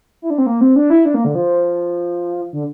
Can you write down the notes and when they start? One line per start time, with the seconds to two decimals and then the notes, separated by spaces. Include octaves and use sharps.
0.22 E4
0.30 D4
0.38 C4
0.46 A#3
0.61 C4
0.76 D4
0.90 E4
1.05 D4
1.14 A#3
1.25 D3
1.35 F3
2.53 D3